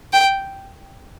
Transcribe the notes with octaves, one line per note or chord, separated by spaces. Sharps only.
G5